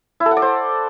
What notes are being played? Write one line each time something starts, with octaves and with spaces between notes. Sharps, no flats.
E4
A4
F#5
D5
C5